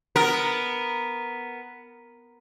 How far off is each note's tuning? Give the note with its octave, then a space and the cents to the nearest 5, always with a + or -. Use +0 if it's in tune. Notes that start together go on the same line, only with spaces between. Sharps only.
B3 +0 A#4 +0